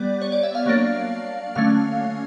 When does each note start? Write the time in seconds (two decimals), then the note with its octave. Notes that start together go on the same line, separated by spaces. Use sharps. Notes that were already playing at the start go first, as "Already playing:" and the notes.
Already playing: G3 B3 D5
0.22 C#5
0.32 D5
0.43 E5
0.55 F5
0.66 F#3 A#3 D4
1.55 D3 F#3 A3 C#4 F5